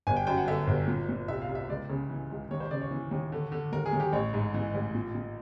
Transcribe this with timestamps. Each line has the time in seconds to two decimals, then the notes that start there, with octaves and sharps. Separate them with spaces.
0.07 G1 G#5
0.16 G5
0.27 F#2 G5
0.37 F#5
0.48 D3 E5
0.67 G1
0.87 A#2
1.09 A#2
1.28 C2 E5
1.42 F5
1.49 C2
1.55 E5
1.69 C#2 D5
1.90 C#3
2.10 E3
2.31 C#2
2.51 D#2 C#5
2.60 C5
2.71 C#3 D5
2.81 C#5
2.91 E3
3.11 D#2
3.32 D3
3.52 D3
3.72 D#2 A#4
3.86 G#4
3.93 D#2
4.00 G4
4.13 A1 C#5
4.34 G#2
4.54 E3
4.74 A1
4.95 A#2
5.15 A#2